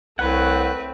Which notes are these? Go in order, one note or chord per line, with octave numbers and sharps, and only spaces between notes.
C2 A3 C4 B4 C#5 F#5